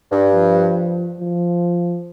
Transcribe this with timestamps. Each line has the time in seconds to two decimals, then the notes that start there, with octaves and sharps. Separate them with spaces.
0.12 G2
0.34 F3
1.20 F3